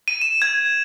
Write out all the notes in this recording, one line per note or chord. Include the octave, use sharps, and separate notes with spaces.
D#7
E7
G#6